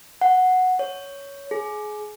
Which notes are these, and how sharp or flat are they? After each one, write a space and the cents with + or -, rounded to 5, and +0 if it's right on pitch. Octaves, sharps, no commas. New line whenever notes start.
F#5 -5
C#5 +10
G#4 +25